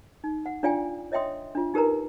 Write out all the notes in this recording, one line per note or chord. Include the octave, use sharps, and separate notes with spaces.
D#4
F#5
D4 F4 D5 F5 G5 G#5
C#5 D#5 E5 G5 C6 D#6
D4 F4
D#4 G4 A#4 B4 A#5